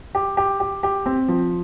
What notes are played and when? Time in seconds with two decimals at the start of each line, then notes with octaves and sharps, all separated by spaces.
0.15 G4
0.37 G4
0.60 G4
0.83 G4
1.06 C4
1.28 F3